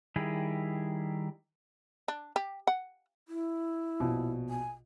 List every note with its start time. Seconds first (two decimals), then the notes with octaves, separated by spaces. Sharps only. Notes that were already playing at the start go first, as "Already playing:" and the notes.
0.16 D#3 G3 E4 G#4
2.08 D4
2.36 G4
2.67 F#5
3.27 E4
4.00 A#1 B2
4.50 G#5